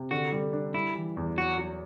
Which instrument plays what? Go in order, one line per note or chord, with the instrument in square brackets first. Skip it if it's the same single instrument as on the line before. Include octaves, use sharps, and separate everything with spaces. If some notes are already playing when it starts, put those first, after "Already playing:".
Already playing: [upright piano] C3
[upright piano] D3 [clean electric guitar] F#4
[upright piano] G3
D4
[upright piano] G3 [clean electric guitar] E4
[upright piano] E3
E2
[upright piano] F#3 [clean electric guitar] F#4
[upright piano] F#3